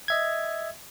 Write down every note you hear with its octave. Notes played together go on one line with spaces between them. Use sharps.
D#5 E5 G#6